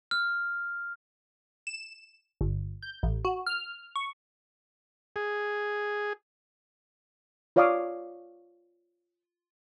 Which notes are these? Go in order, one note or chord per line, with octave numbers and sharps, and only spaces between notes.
F6
E7
G1
G6
A1
F#4
F6
C#6
G#4
F4 C#5 D5 F5 D6 D#6